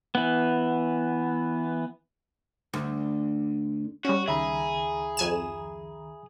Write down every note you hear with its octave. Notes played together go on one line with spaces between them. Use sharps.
E3 B3
D2
G3 C#4 F#4
C#2 D#3 G#4 E5 A#5 B5
F2 G#5 E7